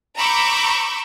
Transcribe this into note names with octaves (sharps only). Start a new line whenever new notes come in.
A#5 B5 C#6 D6 E6 G6